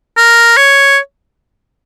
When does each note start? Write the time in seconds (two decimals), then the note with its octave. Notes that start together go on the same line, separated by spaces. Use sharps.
0.17 A#4
0.57 C#5